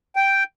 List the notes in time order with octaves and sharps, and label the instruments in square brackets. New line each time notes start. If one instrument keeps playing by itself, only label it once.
[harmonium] G5